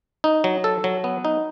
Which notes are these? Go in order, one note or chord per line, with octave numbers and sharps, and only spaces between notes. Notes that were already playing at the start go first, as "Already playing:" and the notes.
D#4
F#3
A4
F#3
B3
D#4